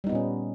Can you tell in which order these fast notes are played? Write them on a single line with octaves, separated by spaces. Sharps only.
G3 D#4 B3 A#2 C#4